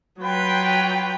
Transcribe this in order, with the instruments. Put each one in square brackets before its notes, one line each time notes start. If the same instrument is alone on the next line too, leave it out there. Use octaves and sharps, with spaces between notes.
[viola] F#3 G5 [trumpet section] B3 F4 B4